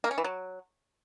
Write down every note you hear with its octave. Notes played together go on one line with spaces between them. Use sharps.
A#3
C#4
E3
F#3